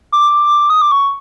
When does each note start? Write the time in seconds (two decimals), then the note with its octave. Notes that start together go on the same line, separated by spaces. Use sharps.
0.12 D6
0.70 D#6
0.82 D6
0.92 C#6